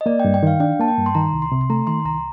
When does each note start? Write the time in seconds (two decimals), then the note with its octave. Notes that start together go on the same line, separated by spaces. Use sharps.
0.01 D#5
0.06 A#3 D5
0.20 G5
0.25 G2
0.34 G5
0.43 D#3 F5
0.60 D4 G5
0.79 A#3 A5
0.88 G5
0.97 G2
1.06 C6
1.15 D#3 A#5
1.33 C2
1.42 C6
1.52 C3
1.61 C6
1.70 A3 A#5
1.87 D#3 C6
2.06 C2 A#5